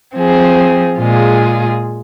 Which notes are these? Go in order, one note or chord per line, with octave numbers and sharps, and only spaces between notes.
F3 C4 G#4
A#2 G#3 F4 G#4